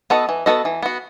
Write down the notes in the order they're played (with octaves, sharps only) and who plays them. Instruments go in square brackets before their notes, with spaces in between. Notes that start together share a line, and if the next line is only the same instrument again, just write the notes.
[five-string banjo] B3 F#4 A4 D#5
E3
B3 F#4 A4 D#5
E3
B3 F#4